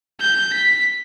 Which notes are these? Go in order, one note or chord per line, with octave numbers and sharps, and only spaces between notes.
G6
B6